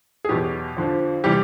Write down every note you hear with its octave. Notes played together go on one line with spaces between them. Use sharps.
G#4
E2 B2 F#3 G4
F2 D3 F3
C3 E3 G3 G4